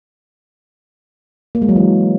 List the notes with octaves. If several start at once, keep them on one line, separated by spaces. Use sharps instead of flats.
A#3
G#3
F#3
E3